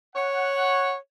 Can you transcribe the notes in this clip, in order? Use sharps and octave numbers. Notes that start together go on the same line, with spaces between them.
C#5 F#5